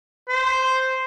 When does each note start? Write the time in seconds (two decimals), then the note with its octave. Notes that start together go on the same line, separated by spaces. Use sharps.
0.28 C5